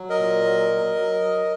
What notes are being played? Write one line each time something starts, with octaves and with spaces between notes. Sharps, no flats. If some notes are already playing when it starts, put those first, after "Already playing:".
Already playing: F#3
A#4 D#5
A#2
F#3
F#3
F#3
F#3